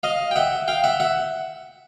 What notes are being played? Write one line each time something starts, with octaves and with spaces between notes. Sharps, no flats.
D#5 F5
G5
E5 F#5
F5 G5
E5 F#5
E5 F#5